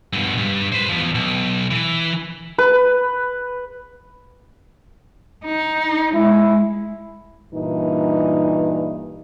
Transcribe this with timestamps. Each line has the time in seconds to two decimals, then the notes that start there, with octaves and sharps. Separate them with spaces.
0.13 G2 B2
0.38 G2
0.72 B4 C5
0.89 E2 F3
1.15 B1
1.71 E3
2.58 B4
5.45 D#4
6.14 G#3 E4
7.53 G2 A#2 E3 D#4